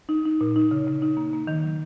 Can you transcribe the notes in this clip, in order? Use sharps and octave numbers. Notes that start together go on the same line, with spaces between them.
D#4
D#4
A#2
D#4
C#3
C#3
D#4
A#3
A#3
D#3
F#3